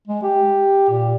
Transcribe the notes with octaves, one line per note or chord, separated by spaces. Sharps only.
G#3
G4
A#2